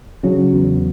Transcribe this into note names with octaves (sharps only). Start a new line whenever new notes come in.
C#3 F#3
E2